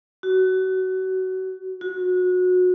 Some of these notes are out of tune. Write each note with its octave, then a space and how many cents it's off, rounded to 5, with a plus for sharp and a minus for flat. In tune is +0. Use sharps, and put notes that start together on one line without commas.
F#4 +25
F#4 -25